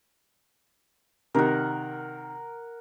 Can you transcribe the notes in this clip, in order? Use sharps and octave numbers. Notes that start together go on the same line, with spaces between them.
C3 D#3 A#4 F#5